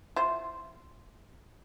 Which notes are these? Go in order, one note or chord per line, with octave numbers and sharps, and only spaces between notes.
E4 F4 C5